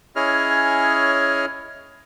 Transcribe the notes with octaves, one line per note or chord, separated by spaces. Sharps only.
C#4 E4 G#4 C#5 D#5 F6